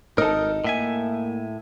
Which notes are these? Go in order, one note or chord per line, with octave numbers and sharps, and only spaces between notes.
G#1 D#4 A4 A#4 D#5
A2 A#3 E5 G#5